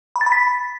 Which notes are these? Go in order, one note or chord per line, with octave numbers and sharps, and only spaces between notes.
B5
A6
B5
B6